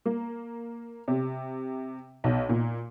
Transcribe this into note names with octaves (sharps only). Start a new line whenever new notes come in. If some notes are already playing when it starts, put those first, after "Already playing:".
A#3
C3
B1
A#2